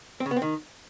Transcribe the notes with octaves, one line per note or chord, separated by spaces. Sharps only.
C4
C#3
B3
C4
D#3